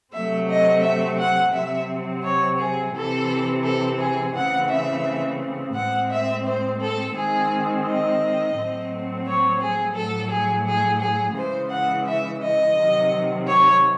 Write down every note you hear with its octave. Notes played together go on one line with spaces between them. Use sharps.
C3 F#3 A3 C4 E5
D#5
E5
F#5
C3 F#3 C4 E5
C#5
G#4
C3 E3 C4 A4
A4
G#4
C#3 E3 A3 C4 F#5
E5
A2 G#3 C4 F#5
E5
C5
A4
D#3 G#3 C4 G#4
D#5
A2 F#3 A3 C4
C#5
G#4
A2 F#3 A3 A4
G#4
G#4
G#4
C#3 E3 G#3 C5
F#5
E5
D#5
C3 D#3 F#3
C#5